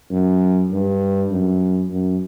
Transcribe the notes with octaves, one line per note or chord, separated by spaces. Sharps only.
F#2
G2
F#2
F#2